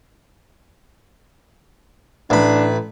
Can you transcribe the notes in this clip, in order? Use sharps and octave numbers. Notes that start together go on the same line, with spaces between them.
A1 D4 B5